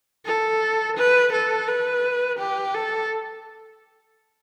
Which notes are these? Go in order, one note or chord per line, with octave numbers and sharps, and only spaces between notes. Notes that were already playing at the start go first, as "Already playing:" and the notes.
A4
B4
A4
B4
G4
A4